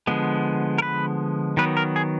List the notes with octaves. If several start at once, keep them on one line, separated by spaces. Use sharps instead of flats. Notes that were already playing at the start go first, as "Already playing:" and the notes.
D3 F3 G#3 B3
A#4
B4
D#3 F#3 B3 B4
A#4
G#4